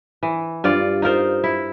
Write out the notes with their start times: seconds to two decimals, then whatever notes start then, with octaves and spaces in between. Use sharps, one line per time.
0.23 E3
0.64 G2 F4 D5
1.02 D#4 F4 A#4 C5
1.44 E4